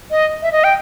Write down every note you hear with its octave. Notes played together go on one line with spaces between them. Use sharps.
D#5
E5
D#5
G5